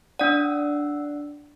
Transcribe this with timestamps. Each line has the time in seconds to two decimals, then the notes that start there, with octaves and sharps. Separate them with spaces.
0.19 D4 D5 F#5 E6